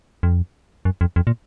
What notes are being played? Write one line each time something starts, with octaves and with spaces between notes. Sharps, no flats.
F2
F#2
F2
F2
A#2